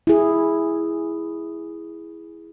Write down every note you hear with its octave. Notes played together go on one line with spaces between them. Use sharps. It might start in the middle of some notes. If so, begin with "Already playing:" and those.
E4 G#4